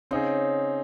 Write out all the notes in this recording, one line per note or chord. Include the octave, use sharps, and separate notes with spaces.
C#3 C4 D#4 G#4